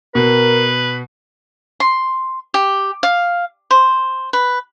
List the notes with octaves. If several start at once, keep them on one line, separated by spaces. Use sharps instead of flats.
B2 A#4 B4
C6
G4
F5
C5
B4